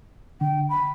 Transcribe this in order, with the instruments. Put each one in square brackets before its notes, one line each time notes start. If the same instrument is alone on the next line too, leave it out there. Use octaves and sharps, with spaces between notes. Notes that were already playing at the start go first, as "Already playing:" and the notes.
[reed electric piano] D3 [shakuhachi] G5
[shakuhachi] B5